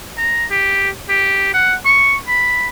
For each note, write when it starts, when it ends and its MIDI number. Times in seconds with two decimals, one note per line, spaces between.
0.18 0.45 82
0.51 0.90 67
1.09 1.53 67
1.54 1.75 78
1.86 2.17 85
2.28 2.68 83